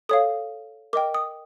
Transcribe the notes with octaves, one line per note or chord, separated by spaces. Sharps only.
A4 C#5 F5 D#6
A#4 D#5 G5 D6
D#6